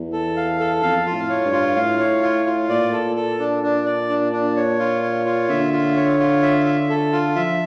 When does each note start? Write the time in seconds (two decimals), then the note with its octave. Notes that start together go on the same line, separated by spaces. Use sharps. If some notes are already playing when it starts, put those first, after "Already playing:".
Already playing: E2
0.13 A4
0.36 F5
0.59 A4
0.82 F2 F5
1.06 F4
1.14 A2
1.29 C#5
1.45 G2
1.53 F4
1.76 A2 F5
1.99 C#5
2.23 F4
2.46 F4
2.69 A#2 D5
2.92 A4
3.16 A4
3.39 D4
3.63 D4
3.86 D5
4.09 D4
4.32 D4
4.56 C#5
4.79 F4
5.03 C#5
5.26 F4
5.49 D3 E5
5.73 F4
5.96 C#5
6.19 F4
6.42 E5
6.65 E5
6.89 A4
7.12 F4
7.36 F3 E5